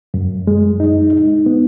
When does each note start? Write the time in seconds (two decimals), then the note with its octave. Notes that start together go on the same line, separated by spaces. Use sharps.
0.14 F#2
0.47 G#3
0.80 D#4
1.13 D#4
1.46 B3